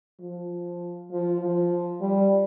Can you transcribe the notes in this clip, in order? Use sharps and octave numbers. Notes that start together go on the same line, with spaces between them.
F3
F3
F3
G3